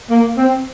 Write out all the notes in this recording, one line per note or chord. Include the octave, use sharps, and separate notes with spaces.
A#3
C4